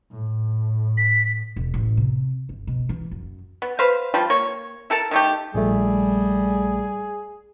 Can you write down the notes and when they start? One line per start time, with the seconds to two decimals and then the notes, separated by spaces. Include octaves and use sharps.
0.11 A2
0.97 B6
1.56 E1
1.74 A1
1.97 C3
2.49 G1
2.67 B2
2.89 E3
3.11 F#2
3.62 B3
3.79 B4 C5 F5
4.14 F3 G3 F4
4.30 A#3 C#5
4.90 E4 A4 A#4 A5
5.11 D#3 A3 G4
5.55 A#1 G3 A3 G#4